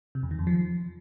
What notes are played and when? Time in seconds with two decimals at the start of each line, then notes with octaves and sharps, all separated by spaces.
0.15 C3
0.23 E2
0.31 D#3
0.39 F2
0.47 F3